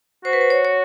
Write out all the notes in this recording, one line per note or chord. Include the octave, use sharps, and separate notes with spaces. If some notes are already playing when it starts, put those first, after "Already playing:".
F#4 C5
B4
C5
C#5
C#5